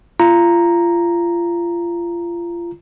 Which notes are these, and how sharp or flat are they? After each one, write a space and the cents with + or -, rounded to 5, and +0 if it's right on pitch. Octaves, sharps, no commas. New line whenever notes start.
F4 -30 A#5 +0